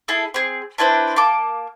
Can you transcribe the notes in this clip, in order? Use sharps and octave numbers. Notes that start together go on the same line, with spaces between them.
E4 G#4 A4
C4 G#4
D4 E4 B4 C5
A#3 A5 D6